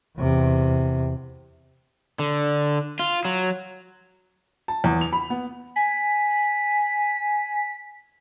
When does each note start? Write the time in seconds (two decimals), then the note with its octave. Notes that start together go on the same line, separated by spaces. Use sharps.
0.17 E2 C3
2.19 D3
2.99 F4
3.25 F#3
4.68 A5
4.84 E2
5.01 F7
5.13 B5
5.30 B3
5.76 G#5 B6